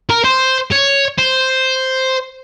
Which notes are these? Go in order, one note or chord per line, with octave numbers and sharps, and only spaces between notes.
A#4
C5
C#5
C5